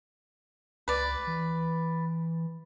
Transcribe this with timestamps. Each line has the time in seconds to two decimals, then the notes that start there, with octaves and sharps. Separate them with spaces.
0.88 C#2 B4 D5
1.27 E3